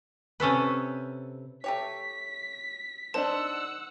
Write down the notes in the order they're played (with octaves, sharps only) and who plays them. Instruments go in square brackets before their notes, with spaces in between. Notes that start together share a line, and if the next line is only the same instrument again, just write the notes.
[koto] C3 C#4 A4 B4
[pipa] A3 G4 C#5 [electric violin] B6
[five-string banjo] D4 D#4 A#4 [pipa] C5 [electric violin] F#5 E6 [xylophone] A5